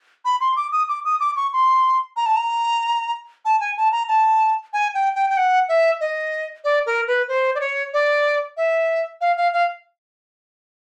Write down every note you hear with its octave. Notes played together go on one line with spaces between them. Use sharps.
B5
C6
D6
D#6
D6
D#6
D6
C#6
C6
A#5
A5
A#5
A5
G#5
A5
A#5
A5
G#5
G5
G5
G5
F#5
E5
D#5
D5
A#4
B4
C5
D5
C#5
D5
E5
F5
F5
F5